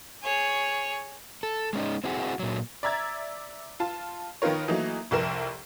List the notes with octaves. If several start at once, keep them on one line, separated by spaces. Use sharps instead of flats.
G#4 C#5
A4
G#3 C#4 D#4
C4 E4 F#4 G#4
A#2 F#3
D5 E5 A#5 E6 G#6 A6
F4 A5
D#3 B3 D#4 F4 A#4 C#5
E3 F#3 A3 A#3 D#4
F1 C2 F2 E4 A#4 E7